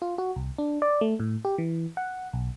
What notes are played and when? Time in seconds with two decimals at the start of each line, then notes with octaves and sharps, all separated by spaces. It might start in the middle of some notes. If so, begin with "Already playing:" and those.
0.02 F4
0.18 F#4
0.36 C2
0.58 D4
0.82 D5
1.01 A3
1.20 A2
1.45 G4
1.58 E3
1.97 F#5
2.33 B1